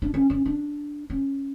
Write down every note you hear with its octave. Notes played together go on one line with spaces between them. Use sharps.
D4
C#4
C#4
D4
C#4